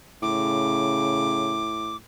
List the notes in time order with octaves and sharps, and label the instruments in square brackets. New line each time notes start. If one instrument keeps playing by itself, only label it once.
[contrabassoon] A2 [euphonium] C#3 [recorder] D6